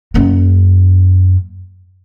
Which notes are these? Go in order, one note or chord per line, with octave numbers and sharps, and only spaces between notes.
F#2 A#3